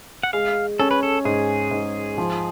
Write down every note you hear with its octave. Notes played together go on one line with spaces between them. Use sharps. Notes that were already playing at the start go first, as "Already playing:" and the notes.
F#5
G#3 F5
C#4 A4
B4
A4
G#2 G#4
G#2
F3